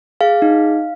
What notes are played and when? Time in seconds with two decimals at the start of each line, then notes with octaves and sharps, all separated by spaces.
0.21 G#4 F5
0.42 D#4